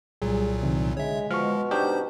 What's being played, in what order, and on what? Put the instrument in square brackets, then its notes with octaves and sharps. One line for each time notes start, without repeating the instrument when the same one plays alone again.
[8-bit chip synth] C2 A#2 F#3 [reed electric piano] G3 G#4
[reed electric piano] C3 D#3
[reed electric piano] D3 [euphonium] G#3 [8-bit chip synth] C#5 E5
[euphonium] B2 [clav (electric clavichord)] F3 [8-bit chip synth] G#3 [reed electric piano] C#6 F6
[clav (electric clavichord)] D4 D#4 G4 [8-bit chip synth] C5 G6